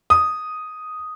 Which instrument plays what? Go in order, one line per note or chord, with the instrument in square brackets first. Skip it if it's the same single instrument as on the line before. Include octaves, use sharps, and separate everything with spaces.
[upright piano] D#6